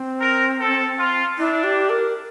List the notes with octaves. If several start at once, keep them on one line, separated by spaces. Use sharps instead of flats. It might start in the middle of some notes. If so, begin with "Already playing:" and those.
Already playing: C4
A#4
A4
F4
D4 E4
G4
A#4